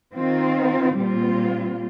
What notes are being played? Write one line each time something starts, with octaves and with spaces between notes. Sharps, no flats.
D#3 C4 F4
A#2 G3 C4 F4